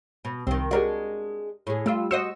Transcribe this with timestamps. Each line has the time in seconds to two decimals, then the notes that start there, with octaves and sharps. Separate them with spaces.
0.25 B2
0.47 C2 D#3 C4
0.71 G#3 D4 F#4 G4 A#4 D#5
1.67 A2 G#4
1.86 G3 A3 F4 E6
2.11 F#4 C5 D#5 E6 C#7 E7